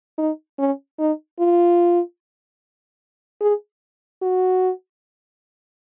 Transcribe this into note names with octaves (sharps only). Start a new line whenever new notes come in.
D#4
C#4
D#4
F4
G#4
F#4